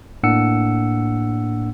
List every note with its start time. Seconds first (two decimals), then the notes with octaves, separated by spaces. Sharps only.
0.23 A2 A#3 D4 F#5 E6 C#7